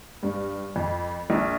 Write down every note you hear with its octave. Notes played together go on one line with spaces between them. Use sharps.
G2
F2
A#1